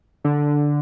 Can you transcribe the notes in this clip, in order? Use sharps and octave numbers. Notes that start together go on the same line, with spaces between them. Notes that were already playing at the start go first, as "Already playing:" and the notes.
D3